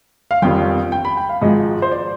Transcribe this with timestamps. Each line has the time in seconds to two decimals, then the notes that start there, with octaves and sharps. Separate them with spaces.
0.31 F5
0.42 G1 F2 D#3 G3 G5
0.92 G5
1.05 B5
1.17 G5
1.29 F5
1.42 G#1 G#2 F3 G#3 D#5
1.82 C5
1.92 D5